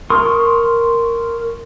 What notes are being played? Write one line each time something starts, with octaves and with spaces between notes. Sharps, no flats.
A#4 C6 C#6 D#6